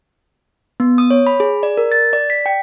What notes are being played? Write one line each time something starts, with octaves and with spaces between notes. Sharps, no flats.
B3
D#6
C#5
B5
G#4
D5
A#4
A6
D5
B6
G5